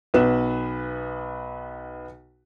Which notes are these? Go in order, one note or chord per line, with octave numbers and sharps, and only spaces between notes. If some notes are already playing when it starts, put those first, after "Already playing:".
B1 B3 B4 E7